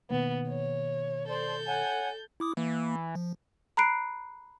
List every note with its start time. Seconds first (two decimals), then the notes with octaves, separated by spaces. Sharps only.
0.10 B2 D#3 A#3 B3
0.49 C#5
1.28 A4 C5 D5 C6 G6
1.66 C#5 F#5 G#5
2.40 E4 D6 D#6
2.57 E3 A#3
3.15 F3
3.77 A#5 B5 F#6 C7 D7